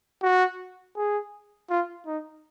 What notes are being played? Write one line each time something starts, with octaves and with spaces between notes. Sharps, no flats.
F#4
G#4
F4
D#4